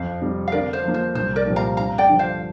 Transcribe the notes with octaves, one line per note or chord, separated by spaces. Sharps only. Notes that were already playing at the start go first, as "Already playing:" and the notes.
Already playing: F2 C5 F5
C3 G3
F5
D3 A#4 D5
C5 F5
F3 A#3
C5
C2 C5
A#4 D5
A#2 F3 C4 G4
F5 A#5
G2 F5 A#5
D5 G5
D3 F3 D4
C5 F5